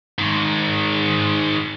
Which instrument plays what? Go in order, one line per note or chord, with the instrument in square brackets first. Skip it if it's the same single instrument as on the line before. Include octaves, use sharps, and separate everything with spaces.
[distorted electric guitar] G#2 D#3